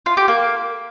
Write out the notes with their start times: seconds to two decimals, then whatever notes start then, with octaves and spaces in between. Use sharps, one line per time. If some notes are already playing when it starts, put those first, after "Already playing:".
0.06 F4
0.17 G4
0.28 A#3